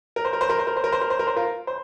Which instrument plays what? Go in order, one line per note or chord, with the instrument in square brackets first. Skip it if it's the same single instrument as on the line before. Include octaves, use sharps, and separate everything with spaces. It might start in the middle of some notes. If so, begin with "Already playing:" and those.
[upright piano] A#4
C5
A#4
C5
A#4
C5
A#4
C5
A#4
C5
A#4
C5
A#4
C5
F4 A#4
C5